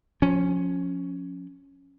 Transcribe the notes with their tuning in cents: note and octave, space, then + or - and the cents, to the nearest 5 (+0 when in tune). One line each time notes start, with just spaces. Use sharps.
F3 +30 C#4 +0